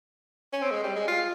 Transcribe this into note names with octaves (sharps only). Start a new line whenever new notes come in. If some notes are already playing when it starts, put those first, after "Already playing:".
C#4
C4
G#3
G3
G#3
F4